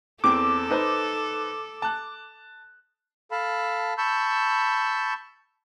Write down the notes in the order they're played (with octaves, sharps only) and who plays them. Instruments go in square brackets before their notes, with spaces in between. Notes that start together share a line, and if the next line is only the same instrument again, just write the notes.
[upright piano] E2 C4 [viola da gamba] A4 [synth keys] D6
[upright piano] D#4 B4 C5
A5 F#6
[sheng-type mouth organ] A4 F5 A5 B5
A5 B5 C#6 E6 G6